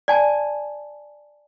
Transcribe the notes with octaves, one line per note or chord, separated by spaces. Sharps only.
D5 G#5 A5